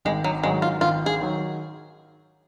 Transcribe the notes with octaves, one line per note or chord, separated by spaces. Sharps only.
G#1 G#3
F#3
G#2 D#3 F#3 G#3
F4
G#1 F4
G#4
D#3 F#3